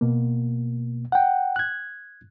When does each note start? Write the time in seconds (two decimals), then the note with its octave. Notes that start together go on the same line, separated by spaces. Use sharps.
0.01 B2 A#3
1.12 F#5 G5
1.56 F#6 G#6